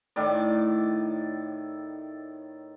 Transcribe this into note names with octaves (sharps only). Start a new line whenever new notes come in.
A2 D#3 D5